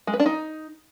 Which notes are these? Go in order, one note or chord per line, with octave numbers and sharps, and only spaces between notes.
G#3
B4
D4
D#4